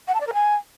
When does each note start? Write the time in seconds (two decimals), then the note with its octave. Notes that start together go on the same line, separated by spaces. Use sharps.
0.07 F#5
0.14 A5
0.20 D5
0.27 A#4
0.33 G#5